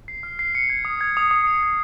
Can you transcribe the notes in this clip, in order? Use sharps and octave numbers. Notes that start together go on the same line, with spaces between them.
C7
F6
C7
C#7
G#6
D#6
G#6
D#6
D#6
C#7
G#6